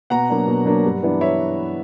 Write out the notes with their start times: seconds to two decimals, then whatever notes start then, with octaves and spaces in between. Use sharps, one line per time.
0.10 B2 F#5 A#5
0.29 F#3 A#3 D4
0.47 B2
0.65 F#3 A#3 D4
0.85 G2
1.03 E3 B3 D4
1.21 C#5 E5